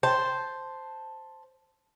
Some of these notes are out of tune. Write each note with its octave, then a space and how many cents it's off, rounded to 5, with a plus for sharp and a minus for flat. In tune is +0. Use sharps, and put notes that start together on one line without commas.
C5 +0 A5 +0